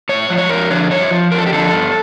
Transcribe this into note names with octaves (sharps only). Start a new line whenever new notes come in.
A2 C#5
F3
C#5
F2 A#4
D3 F3 C#5
G2 C#5
F3
F2 A#4
A4
G4
D3 F3 A4
G2